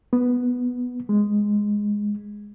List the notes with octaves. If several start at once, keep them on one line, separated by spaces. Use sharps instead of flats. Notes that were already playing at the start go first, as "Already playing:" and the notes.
B3
G#3